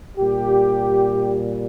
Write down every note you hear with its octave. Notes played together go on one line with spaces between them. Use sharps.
A#2 G3 G4